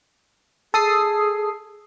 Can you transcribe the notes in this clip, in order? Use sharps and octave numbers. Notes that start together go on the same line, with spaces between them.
G#4 A4 D#6 C7